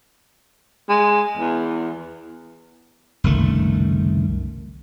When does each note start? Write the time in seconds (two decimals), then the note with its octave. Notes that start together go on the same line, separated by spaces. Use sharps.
0.89 G#3
1.37 E2
3.24 F#1 C2 D#3 A3